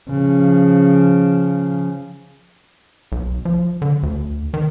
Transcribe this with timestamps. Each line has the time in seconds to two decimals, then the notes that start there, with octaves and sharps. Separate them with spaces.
0.10 C#3 F3
3.12 B1
3.45 F3
3.82 D3
4.03 D2
4.54 D#3